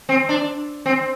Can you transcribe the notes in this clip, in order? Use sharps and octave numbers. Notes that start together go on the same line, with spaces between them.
C4
D4
C4